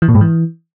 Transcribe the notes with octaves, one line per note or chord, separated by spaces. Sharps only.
E3
A#2
G#2
E3